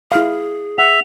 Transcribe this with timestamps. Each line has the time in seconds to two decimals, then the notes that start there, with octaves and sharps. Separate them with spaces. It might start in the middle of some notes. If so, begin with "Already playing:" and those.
0.12 E4 G#4 F5
0.78 E5 F#5 F7